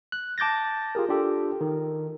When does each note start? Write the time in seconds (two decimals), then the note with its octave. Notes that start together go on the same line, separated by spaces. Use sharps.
0.12 F#6
0.38 A5 D6 G6 A6 A#6
0.95 F4 G4 G#4 A#4
1.09 D4 F4 G4 A4
1.61 D#3